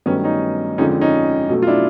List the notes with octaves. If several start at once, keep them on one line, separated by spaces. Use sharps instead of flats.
G2 D#3 F#3 A3 B3 C#4
C#4 D#4
F2 D3 F3 G#3 C#4 D#4
C#4 D#4
B2 F#3 A3
F4
D4 E4